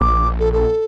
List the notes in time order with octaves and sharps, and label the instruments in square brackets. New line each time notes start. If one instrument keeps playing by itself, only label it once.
[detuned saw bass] A#1 [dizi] D6
[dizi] A4
A4